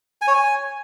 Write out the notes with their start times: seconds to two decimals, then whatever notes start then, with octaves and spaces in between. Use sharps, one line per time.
0.22 G#5
0.27 C#5
0.33 G#5